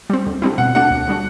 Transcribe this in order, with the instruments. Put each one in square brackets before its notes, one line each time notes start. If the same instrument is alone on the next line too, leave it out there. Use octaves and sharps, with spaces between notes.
[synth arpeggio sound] G3 C4
D2
D3 G3 C4 E4
[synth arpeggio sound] B2 [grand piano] F#5
[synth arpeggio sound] A3 D4 F#4 [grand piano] F#5
[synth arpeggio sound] D2
D3 G3 D4 F#4